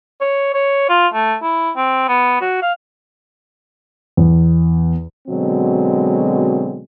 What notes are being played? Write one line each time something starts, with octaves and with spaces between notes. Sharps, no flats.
C#5
C#5
F4
A3
E4
C4
B3
F#4
F5
E2
B2 D3 F#3 G#3 C4